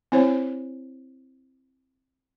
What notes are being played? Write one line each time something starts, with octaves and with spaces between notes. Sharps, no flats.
C4 E4 C5 C#5